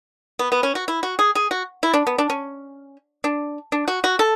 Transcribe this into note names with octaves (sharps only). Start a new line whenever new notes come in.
B3
B3
C#4
F#4
E4
F#4
G#4
G#4
F#4
E4
D4
B3
D4
C#4
D4
D4
F#4
F#4
A4